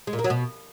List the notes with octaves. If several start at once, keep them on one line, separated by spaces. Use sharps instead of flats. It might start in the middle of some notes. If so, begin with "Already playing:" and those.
G#3
A#2
A#3
F#3
B2